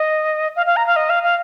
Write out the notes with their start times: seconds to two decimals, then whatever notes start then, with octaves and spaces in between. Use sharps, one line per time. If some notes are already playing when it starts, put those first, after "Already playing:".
Already playing: D#5
0.56 F5
0.66 F5
0.76 A#5
0.87 F5
0.96 D#5
1.10 F5
1.23 F5